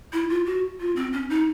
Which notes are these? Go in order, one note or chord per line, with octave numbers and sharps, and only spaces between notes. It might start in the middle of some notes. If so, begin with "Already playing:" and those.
E4
F4
F#4
F4
C4
C#4
D#4